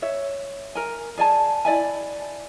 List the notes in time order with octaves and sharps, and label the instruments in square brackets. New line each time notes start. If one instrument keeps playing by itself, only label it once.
[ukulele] C#5 E5
A#4 G#5
G#4 D5 G#5 A5
E4 D5 E5 G#5